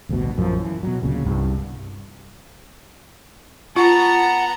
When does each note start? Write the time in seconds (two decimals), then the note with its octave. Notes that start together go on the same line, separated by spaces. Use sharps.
0.09 A1 D2 G2 B2
0.36 A#1 F#2 D#3 F3
0.59 E3
0.83 B2 F#3
1.03 D2 A#2 C#3
1.25 C2 G2
3.76 B3 F4 F#5 A5 A#5